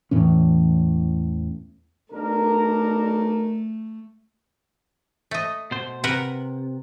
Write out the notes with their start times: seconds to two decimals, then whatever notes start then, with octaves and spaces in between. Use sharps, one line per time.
0.11 E2 A2 E3 C#4
2.12 B1 A3 D4 A#4
5.31 A3 D#5
5.71 B2 C5
6.04 C3 A#4 B4 F#5